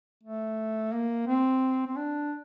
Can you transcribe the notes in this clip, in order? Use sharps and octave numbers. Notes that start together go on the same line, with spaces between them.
A3
A#3
C4
C4
D4